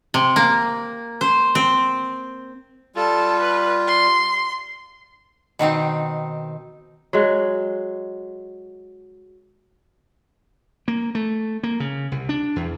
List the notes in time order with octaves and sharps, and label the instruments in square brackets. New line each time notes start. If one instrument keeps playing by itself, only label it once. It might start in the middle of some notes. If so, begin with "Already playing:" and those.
[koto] C3
A#3
C5
C4
[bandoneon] G3 F4 [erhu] A4
[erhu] B4
C6
[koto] B2 D#3 C4 D#4
[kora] F#3 G#3
[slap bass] A#3
A3
A#3
C#3
C2
D4
E2